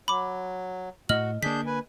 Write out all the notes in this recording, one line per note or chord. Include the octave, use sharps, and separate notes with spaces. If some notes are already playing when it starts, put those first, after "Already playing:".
F#3 B5 D6
A2 F#4 D#5 F6 F#7
D3 A#3 D4 G#4 G6 B6
B4 G#5